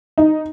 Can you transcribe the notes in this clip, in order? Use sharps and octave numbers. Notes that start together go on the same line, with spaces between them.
D#4